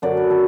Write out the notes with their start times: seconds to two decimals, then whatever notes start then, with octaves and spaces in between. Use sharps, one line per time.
0.02 F#2 D3 F#3 D5
0.17 B4
0.30 A4